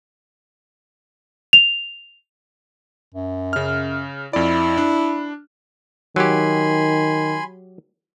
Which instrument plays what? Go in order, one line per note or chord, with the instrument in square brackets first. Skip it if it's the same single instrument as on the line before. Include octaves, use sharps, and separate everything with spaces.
[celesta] F7
[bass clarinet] F#2
[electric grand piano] C#3 F6
[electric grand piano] F2 D5 [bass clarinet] E4
[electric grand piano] D4
[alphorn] D#3 [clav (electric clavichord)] F#3 G4 [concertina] G#5 B5 C6